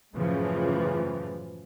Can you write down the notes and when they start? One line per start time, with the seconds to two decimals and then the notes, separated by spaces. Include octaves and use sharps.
0.15 F#2 A2 C#3 E3 F3